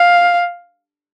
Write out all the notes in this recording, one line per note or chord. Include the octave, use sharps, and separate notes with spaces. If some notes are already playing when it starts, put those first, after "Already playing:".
Already playing: F5